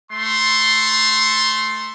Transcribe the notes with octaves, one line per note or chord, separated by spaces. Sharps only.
A3 C6